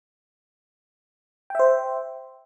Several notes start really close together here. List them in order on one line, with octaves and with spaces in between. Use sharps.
G5 E5 C5